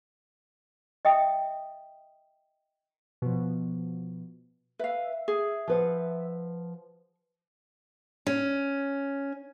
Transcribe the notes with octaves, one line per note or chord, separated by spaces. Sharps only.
D#5 E5 G5 D#6
B2 F3
B4 E5 F5
G#4
F3 B4 F#5
C#4